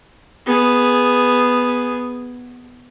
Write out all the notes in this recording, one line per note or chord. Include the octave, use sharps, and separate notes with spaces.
B3 G#4